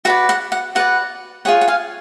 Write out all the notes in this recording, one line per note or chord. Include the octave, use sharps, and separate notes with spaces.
F#4 B4 D5 F#5
F#5
F#5
F#4 B4 D5 F#5
F4 G#4 C#5 F#5
F#5
F5 G#5